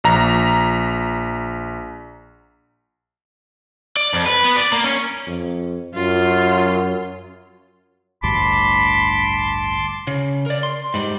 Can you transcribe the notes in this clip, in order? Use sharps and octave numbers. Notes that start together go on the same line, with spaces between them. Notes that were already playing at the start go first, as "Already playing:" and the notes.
A#1 A#5
D5
F2
B4
B3
D5
A#3
C#4
F2
F#2 F4
A1 D2 G2 A5 B5 C6 D6
C#3
A#4 D5
C6
G#2 G3